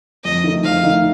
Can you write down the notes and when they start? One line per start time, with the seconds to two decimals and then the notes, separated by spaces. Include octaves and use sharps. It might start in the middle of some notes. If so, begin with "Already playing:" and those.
0.24 F2 D#5
0.44 D#3 A3 D#4
0.64 F2 F5
0.83 D#3 A3 D#4